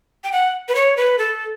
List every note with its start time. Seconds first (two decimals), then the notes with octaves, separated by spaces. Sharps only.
0.24 G5
0.32 F#5
0.68 B4
0.75 C#5
0.97 B4
1.19 A4